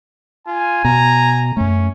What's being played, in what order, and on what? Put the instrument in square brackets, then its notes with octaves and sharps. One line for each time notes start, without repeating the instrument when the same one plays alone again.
[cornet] F4 [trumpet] G#5
[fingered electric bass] B2 [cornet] A#5
[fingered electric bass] F#2 A3 [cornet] C#4